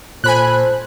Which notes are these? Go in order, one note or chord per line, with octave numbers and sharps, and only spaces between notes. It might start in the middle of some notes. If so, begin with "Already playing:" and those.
A#2 A4 C5 G#5 B5 F#6